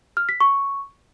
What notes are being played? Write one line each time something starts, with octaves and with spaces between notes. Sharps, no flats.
F6
B6
C#6